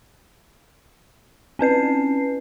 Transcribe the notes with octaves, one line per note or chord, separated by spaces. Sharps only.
C4 C#4 B4 C7